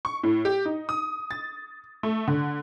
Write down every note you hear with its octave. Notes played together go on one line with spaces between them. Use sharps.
C#6
A2
G4
D#4
D#6
A6
A3
D3